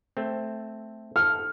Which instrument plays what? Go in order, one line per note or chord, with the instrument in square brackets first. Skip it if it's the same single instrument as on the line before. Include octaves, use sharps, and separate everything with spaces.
[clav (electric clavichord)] A3 C4
[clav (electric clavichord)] A4 [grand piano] F6